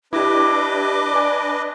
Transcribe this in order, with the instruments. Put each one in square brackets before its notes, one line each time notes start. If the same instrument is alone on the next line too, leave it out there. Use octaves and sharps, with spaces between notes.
[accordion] D4 B4 D#5 [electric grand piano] E4 G4 [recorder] D6
[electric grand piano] D5 G#5